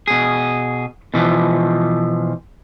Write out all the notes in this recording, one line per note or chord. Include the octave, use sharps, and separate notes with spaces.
B2 G#4
B2 E3 F3